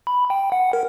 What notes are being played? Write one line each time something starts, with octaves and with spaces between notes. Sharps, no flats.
B5
G5
F#5
A#4